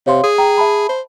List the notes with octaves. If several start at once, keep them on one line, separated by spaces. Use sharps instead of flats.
C3 C#5 F5 C6
G#4 D#6
G5 A#5
E5 A5 B5
C5